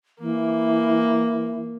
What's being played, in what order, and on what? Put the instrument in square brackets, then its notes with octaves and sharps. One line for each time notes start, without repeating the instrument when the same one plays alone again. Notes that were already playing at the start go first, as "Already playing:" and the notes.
[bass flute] E3 [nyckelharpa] A#3